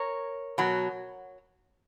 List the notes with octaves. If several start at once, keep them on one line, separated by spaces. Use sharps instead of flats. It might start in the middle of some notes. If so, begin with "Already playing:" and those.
Already playing: A#4 C#5
B2 F#3